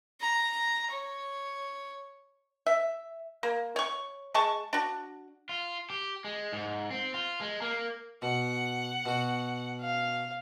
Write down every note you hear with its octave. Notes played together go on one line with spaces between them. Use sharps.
A#5
C#5
E5
A#3
C#5 C#6
G#3 A5 C#6
D4 F#4
F4
G4
G#3
G#2
C4
F4
G#3
A#3
B2 F#5
B2 F#4
F5